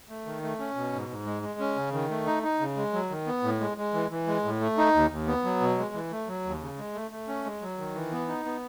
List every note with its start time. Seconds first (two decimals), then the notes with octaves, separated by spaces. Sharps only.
0.09 A3
0.26 D#3
0.43 A3
0.59 C#4
0.76 B2
0.93 G#2
1.09 G#2
1.26 G#3
1.43 G#3
1.60 C#4
1.76 C#3
1.93 D#3
2.10 A3
2.26 D#4
2.43 D#4
2.60 C#3
2.76 G#3
2.93 F#3
3.10 D#3
3.27 B3
3.43 A2
3.60 G#3
3.77 G#3
3.94 E3
4.10 E3
4.27 G#3
4.44 A2
4.61 A3
4.78 D#4
4.94 D#2
5.11 D#2
5.27 B3
5.44 F#3
5.61 B2
5.78 G#3
5.94 E3
6.11 A3
6.28 F#3
6.45 D#2
6.61 C#3
6.78 G#3
6.95 A3
7.11 A3
7.28 C#4
7.45 G#3
7.62 F#3
7.78 D#3
7.95 E3
8.12 B3
8.28 D#4
8.45 B3